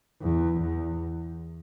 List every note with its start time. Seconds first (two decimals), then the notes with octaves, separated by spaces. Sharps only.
0.22 E2
0.60 E2